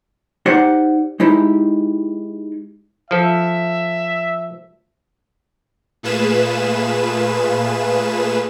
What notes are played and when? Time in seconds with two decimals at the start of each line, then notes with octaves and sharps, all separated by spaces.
0.46 D#4 G4 C5 D5 F#5
1.20 G#3 D#4 E4 G4
3.11 F3 A4 E5
6.03 A#2 A3 F4 G#4 B4 E7